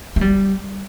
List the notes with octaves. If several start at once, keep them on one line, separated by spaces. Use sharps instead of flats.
A3
G3